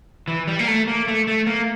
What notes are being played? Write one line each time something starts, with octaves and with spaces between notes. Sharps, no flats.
E3
G3
A#3
A3
A#3
A3
A3
A#3